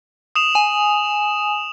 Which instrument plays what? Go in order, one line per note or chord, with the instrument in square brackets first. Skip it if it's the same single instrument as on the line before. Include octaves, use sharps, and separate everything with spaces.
[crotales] D#6 E7 F7
[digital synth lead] G#5